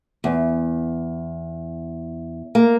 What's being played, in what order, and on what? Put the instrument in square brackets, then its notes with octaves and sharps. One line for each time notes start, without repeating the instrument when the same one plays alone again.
[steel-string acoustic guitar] E2
A#3